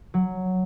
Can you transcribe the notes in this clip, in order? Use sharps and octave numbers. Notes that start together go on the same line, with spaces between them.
F#3